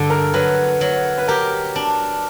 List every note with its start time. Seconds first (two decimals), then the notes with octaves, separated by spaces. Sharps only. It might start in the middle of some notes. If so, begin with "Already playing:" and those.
Already playing: G2 D3 A4
0.10 A#4
0.34 F#3 B4
0.81 F#3
1.18 B4
1.28 G4 A#4
1.76 D4